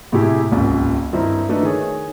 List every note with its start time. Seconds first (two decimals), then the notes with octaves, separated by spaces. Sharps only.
0.12 A2 C3 A3 E4 G4 G#4
0.51 D#1 G#1 C#2
1.13 G2 D#3 C4 D#4 E4
1.49 A3 D4 D#4 A4 B4
1.63 D#3 G#4 C#5